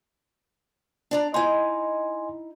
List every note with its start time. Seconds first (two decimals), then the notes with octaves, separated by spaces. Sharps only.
1.11 D4 D5 A#5
1.34 D#4 E4 D#5 G#5 C6